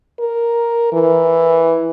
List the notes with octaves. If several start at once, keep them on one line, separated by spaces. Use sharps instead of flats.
A#4
E3